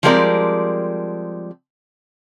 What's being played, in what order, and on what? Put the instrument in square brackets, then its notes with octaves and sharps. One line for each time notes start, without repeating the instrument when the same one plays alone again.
[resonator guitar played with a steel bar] F3 G3 G#3 C4 A#4 D5